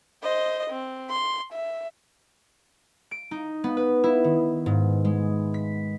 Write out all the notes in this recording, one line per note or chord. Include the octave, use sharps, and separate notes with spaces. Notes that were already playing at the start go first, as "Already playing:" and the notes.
C5 D#5
C4
C6
E5
D7
D#4
B3
B4
E4
D#3
G#2
G#3
B6